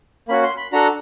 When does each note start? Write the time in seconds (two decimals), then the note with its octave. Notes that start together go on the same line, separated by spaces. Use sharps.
0.28 A#3 C#4 F#4 B5
0.43 C6
0.57 B5
0.72 D4 F#4 A4 A#5